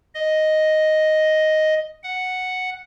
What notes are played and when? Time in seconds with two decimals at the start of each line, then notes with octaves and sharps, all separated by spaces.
0.15 D#5
2.03 F#5